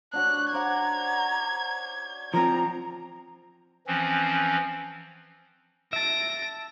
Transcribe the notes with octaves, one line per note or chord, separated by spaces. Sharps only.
D4 F#4 C#5 F#6
C5 D5 F#5 A#5 G#6
F3 C4 A#5
E3 F3 C4 C#4
E5 A5 A#6 D7